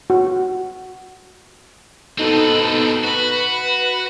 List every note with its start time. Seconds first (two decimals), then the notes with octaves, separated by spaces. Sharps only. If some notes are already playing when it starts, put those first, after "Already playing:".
0.10 F#4
2.18 B2 C4 D#4 A4 B4
3.04 F#4 B4